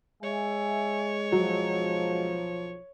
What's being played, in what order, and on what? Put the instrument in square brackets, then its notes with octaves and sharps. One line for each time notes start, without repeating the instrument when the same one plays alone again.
[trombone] G#3 [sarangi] C#5 [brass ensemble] E5 G#5
[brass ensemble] B1 F3 [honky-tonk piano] F#3